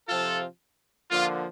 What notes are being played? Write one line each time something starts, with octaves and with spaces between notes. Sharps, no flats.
C3 F3 C4 F4 A4
D3 F3 A#3 F4